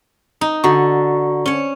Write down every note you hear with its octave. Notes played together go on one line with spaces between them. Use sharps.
D#4
D3 F#4 A#5 C#6
C#4 C#5